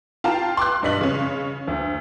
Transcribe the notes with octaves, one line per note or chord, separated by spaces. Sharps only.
F4 F5 G5 A5 A#5
C6 D6 F#6
B1 G2 D5 D#5 B6 F#7
C#3 C#4
D2